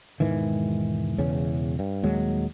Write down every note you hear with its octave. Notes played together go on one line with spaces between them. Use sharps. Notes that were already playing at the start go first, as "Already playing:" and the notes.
E1 G#2 D#3 E3
E1 E2 C#3 C#4
G2
D#1 D#2 F#3 G#3